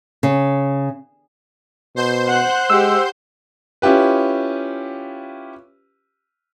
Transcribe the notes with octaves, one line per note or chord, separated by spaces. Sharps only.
C#3
B2 C5 C6 G6
F#5 F#6
G#3 G4 F#5 E6
C#4 E4 F4 G4 B4